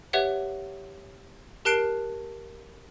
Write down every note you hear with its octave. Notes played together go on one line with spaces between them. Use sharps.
G4 B4 C#5 E5 F#5
G4 A#4 A5 F#6 C7 D7